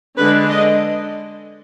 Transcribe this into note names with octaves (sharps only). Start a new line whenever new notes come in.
D3 G#3 D4 B4
D#5